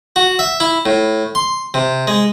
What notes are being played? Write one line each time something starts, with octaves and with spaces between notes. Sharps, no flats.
F#4
E5
E4
A2
C6
C3
G#3